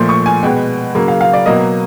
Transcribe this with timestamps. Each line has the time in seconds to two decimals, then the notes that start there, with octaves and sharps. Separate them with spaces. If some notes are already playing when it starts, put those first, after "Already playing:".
Already playing: A#2 F3 A3 C6
0.09 C#6
0.26 G#5
0.43 B2 G#3 B3 G5
0.95 C#3 F#3 A#3
1.08 F5
1.21 F5
1.33 D5
1.46 B2 F#3 A#3 D#5